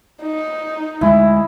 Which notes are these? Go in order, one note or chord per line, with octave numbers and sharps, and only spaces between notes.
D#4
D2 G#3 E4